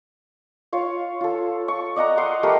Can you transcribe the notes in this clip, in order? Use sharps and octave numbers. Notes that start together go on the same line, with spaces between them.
F4 C#5 F5
F4 A4
C#6
D5 D#5 F#5 A#5
D#5 F5 F#5 C6
G3 A3 G4 A#4